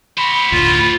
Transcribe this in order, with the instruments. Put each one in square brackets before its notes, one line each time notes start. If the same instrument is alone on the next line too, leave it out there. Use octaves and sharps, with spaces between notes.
[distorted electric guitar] F#4 C5 [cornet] B5
[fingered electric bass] F1 D2 A2 [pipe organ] F4